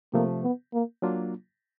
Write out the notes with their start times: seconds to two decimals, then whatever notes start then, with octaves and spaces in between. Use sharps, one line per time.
0.14 C3 F3 A3 A#3
0.43 B3
0.73 A#3
1.02 F#3 A#3 D4 F4